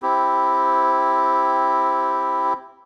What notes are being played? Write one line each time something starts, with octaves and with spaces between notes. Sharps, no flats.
C4 E4 G4